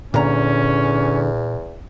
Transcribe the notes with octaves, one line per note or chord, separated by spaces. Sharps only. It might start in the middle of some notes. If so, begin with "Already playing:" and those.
E2 A#2 D3 C#4 A#5